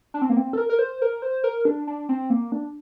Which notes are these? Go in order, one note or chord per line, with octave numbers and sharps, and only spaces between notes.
D4
C4
A#3
C4
A4
A#4
A#4
C5
A#4
C5
A#4
D4
D4
C4
A#3
D4